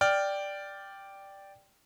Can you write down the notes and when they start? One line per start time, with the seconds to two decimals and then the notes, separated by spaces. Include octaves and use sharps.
0.01 D5 G5 F6